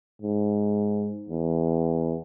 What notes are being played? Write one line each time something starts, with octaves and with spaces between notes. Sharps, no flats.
G#2
E2